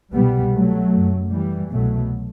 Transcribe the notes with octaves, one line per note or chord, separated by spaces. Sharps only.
C2 B2 G3 B3
F#3 A3
F#2
E3 G3
C2 B2 F#3 A3